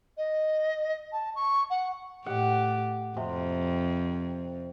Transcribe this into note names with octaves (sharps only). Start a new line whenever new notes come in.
D#5
A5
C#6
F#5
A2 G4 F#5
F2 C3